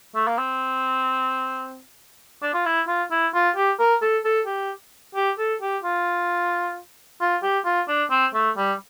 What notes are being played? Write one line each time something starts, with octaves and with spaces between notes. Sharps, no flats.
A3
A#3
C4
D4
F4
E4
F4
E4
F4
G4
A#4
A4
A4
G4
G4
A4
G4
F4
F4
G4
F4
D4
C4
A3
G3